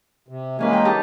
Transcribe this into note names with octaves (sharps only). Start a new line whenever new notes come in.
C3
E3 G#3 A#3 C#4 B4
G5
D#4 G4 A5